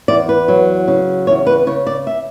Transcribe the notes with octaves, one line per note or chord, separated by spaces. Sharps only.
E2 D5
B4
F#3
C#3
E2 C#5
B4
C#3 C#5
D5
E5